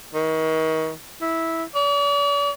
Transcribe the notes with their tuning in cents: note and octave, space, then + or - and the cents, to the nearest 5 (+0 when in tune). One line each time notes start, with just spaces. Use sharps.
D#3 +35
E4 -10
D5 -45